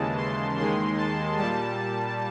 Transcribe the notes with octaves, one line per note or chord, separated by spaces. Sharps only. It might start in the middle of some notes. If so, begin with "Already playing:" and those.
Already playing: D#2 C#3 E3 G#3 A5
C6
D#2 D#3 G#3 C6
A5
A#2 G3 A5